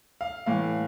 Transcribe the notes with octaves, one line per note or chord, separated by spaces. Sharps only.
F5
A2 E3 F5